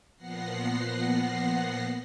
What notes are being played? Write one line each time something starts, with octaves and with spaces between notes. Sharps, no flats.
A#2 F3 B3 F#5 A#6 C7